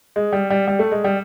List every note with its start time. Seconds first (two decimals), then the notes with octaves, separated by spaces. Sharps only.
0.16 G#3
0.32 G3
0.50 G3
0.67 G3
0.79 A3
0.92 G#3
1.04 G3